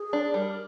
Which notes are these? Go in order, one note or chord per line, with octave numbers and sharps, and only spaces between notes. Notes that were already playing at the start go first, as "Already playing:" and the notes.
Already playing: G#4
D4
G3 A#4